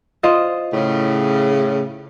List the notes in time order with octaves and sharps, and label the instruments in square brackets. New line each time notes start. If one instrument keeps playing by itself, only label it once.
[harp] F4 C5 D#5
[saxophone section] A2 C#3